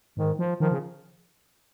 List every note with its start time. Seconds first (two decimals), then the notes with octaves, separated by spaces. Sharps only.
0.17 G#2 D#3
0.39 F3
0.60 D#3 F3
0.71 C#3